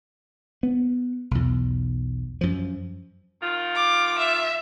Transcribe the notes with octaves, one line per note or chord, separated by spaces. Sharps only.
B3
B1 E2
F#2 F3
D#3 F4
D6
E5